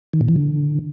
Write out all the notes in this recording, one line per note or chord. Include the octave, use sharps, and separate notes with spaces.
D#3
A#2
E3
D3